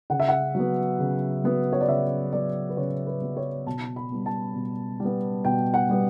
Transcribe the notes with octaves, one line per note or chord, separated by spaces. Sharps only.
C#3 F#5
E5
F#5
F#3 B3
C#3
F#3 B3
C#5
D5
C#3 E5
F#3 B3 D5
B4
C#3 C#5
B4
F#3 B3
C#5
B2 A5
B5
G3 B3
A5
B2
G3 B3
B2 G5
F#5
G3 B3